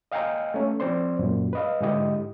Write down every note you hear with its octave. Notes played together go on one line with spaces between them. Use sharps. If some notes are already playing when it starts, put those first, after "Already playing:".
D#5 F5 G5 G#5 A#5
A3 C#4
F3 C4 C5 D5 C6
F#2 A#2
B4 D#5 F5
G#2 D3 G#3 E4 G4 D#5